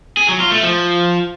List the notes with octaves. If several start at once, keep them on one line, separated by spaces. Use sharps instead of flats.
G#4
F#3
F4
A3
F3